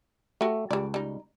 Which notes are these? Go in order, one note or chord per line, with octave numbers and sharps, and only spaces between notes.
A3 F#4 G4
C#2 G3 D5
G3 D#4